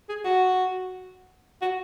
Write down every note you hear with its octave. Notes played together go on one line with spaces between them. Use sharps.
G#4
F#4
F#4